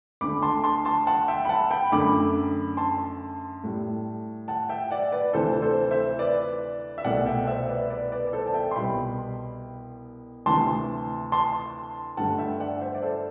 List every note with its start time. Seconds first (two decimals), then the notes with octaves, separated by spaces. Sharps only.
0.21 D2 D3 A3 B5 D6
0.42 A5 C6
0.64 A5 C6
0.85 A5 C6
1.07 F#5 A5
1.28 E5 G5
1.45 B5
1.49 F#5 A5
1.71 G5 B5
1.92 F#2 D3 A3 B5 D6
2.77 A5 C6
3.64 A2 G3
4.48 F#5 A5
4.69 E5 G5
4.91 D5 F#5
5.12 B4 D5
5.33 D2 C3 E3 A4 C5
5.62 A4 C5
5.91 C5 E5
6.19 B4 D5
6.98 E5
7.04 C2 B2 A3 D5 F#5
7.26 E5 G5
7.47 C5 E5
7.69 B4 D5
7.90 B4 D5
8.12 B4 D5
8.27 D5
8.33 A4 C5
8.46 A5
8.54 E5 G5
8.71 C6
8.76 C2 B2 G3 G5 B5
10.46 D2 C3 E3 A5 C6
11.32 A5 C6
12.17 G2 D3 A3 F#5 A5
12.38 E5 G5
12.60 D5 F#5
12.81 C5 E5
12.95 D5
13.03 A4 C5